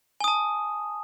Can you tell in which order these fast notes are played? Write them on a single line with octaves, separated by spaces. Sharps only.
G#5 D#6 A5